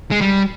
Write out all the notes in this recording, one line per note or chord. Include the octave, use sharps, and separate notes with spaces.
G#3
G3